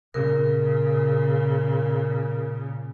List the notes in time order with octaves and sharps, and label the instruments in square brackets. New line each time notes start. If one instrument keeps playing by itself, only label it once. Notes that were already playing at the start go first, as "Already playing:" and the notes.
[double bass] A#2 C#3 [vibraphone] A#4